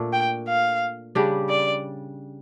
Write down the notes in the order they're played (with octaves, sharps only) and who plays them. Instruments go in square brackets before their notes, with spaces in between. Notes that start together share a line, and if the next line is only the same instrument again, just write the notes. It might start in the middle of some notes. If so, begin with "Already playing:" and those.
Already playing: [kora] A#2 A3 D4
[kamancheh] G5
F5
[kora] C#3 G3 D4 G4
[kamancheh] D5